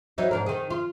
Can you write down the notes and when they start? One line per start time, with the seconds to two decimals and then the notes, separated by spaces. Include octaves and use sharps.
0.18 F#3 D#4 E4
0.31 G#2 D4 A#4
0.46 D#3 G#4
0.70 F4